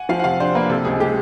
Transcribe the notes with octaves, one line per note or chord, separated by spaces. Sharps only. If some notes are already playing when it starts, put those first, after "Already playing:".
Already playing: F#5 G#5
F3 F5
F#5
C3 F5
D4 C5
A#3 B4
C3 A4
C#2 G#4
G#3 G4